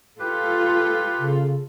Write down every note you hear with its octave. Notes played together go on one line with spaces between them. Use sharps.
F4 G4 A4 B4
C#3